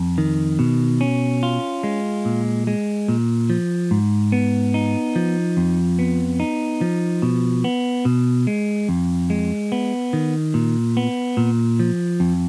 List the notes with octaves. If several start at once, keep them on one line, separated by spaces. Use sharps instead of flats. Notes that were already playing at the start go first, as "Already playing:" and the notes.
Already playing: F2
D#3
B2
C#4
F4
G#3
A#2
G#3
A#2
F3
G#2
B3
D#4
F3
F2
B3
D#4
F3
B2
B3
B2
G#3
F2
G#3
B3
D#3
A#2
B3
A#2
F3
F2